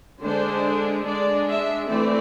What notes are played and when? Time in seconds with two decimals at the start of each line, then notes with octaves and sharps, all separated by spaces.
0.22 D3 G#3 D4 C5
1.06 G#3 D4 D5
1.48 E5
1.89 E3 A3 C4 D5